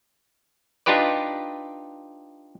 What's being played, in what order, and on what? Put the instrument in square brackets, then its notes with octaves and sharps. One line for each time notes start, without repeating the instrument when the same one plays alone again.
[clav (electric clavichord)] D4 D#4 F4 G4 B4 D5